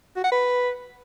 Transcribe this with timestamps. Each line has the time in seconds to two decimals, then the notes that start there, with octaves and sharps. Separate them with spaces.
0.17 F#4
0.24 F#5
0.32 B4